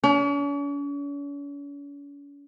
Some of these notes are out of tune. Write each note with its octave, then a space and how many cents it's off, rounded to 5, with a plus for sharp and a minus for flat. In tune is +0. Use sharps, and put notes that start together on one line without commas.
C#4 +45